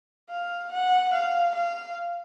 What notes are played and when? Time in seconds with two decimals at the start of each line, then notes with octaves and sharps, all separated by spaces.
0.30 F5
0.71 F#5
1.13 F5
1.55 F5